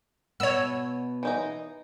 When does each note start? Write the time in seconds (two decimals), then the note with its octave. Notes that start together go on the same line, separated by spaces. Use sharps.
0.40 B2 B3 C#5 E6
1.23 E3 D#4 A#5